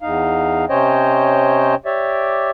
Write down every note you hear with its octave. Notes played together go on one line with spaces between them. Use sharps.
E2 D#4 F5
C3 C#4 C5 C#5 D#5 G5
G4 C#5 D5 E5